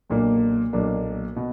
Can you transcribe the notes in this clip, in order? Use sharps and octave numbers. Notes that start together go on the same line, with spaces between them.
B1 A#2 A#3 D4
B1 A#2 A#3 D4
B2